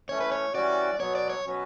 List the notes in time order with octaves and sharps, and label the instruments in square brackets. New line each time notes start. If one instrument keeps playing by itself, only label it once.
[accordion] E3 A3 C#4 [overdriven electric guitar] C#5
[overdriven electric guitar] B4
C#5
[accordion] E3 G3 C#4 F#4 [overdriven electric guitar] D5
[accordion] B2 F#3 B3 [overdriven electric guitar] C#5
[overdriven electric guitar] D5
C#5
[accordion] B2 F#3 C#4 F#4 B4